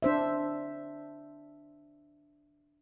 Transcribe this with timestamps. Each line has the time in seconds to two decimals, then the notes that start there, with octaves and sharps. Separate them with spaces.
0.02 D4 C5 E5